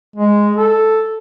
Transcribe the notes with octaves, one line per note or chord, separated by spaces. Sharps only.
G#3
A4